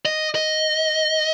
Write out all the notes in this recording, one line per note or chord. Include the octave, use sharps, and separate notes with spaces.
D#5
D#5